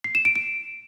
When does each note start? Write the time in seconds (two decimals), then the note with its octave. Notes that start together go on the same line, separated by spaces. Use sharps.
0.04 C7
0.15 E7
0.25 D7
0.36 D7